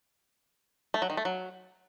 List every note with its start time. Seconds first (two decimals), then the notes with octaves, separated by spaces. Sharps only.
0.94 A3
1.02 F#3
1.10 D#3
1.17 A3
1.25 F#3